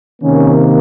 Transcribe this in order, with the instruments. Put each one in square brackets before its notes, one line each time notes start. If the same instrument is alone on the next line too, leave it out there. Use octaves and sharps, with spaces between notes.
[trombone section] C3 D#3 A#3 C#4